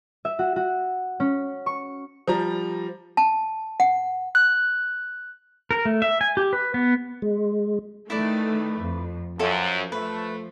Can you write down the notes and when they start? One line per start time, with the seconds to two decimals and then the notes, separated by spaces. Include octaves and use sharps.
0.25 E5
0.39 F#4
0.56 F#4
1.20 C#4
1.66 C#6
2.28 F3 G3 A#5
3.17 A5
3.80 F#5
4.35 F#6
5.71 A#4
5.85 A3
6.02 E5
6.21 G#5
6.37 G4
6.53 B4
6.74 B3
7.22 G#3
8.10 D#3 A3 E4 B4 D5
8.80 F2
9.39 F#2 F3 F4 A4
9.92 A3 B4